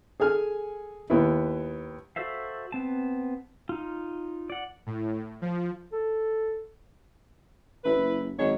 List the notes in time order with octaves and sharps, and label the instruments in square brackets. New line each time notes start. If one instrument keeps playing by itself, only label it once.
[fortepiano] G#4 A4 G#5 F6
D#2 B3 E4
[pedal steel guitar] F#4 A4 C5 E5 F5
B3 C4 A5
D#4 F4
D5 F#5
[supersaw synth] A2
F3
[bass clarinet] A4
[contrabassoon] A1 [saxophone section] E4 B4
[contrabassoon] F#1
[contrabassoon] G#1 [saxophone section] F#2 G#3 C#5